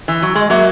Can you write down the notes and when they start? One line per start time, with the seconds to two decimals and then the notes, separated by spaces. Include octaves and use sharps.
0.08 E3
0.22 F#3
0.35 G#3 D#5
0.50 F#3 A#3 E5